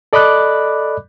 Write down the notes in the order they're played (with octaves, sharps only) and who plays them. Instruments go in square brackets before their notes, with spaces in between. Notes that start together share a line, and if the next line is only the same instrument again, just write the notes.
[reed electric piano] A4 D5 D#5 B5 D6 F#6